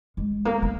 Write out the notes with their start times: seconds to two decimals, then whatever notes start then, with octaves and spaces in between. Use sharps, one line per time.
0.17 G#3
0.45 A#3
0.62 A#3